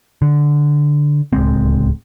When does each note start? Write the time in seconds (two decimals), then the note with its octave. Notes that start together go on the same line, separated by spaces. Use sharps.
0.22 D3
1.33 D1 C#2 G#3 C4